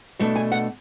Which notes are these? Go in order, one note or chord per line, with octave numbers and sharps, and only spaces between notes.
B2 A3 D4
G#5
F#5